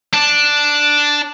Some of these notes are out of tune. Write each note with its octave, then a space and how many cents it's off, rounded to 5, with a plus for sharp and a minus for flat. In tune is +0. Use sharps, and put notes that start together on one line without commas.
D4 +0 A5 +0